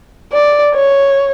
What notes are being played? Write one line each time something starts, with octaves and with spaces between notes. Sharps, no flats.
D5
C#5